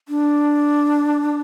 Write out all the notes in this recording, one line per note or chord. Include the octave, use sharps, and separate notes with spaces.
D4